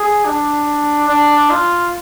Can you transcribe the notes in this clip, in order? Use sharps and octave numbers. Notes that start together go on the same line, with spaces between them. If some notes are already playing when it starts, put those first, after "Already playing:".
Already playing: G#4
D4
D4
F4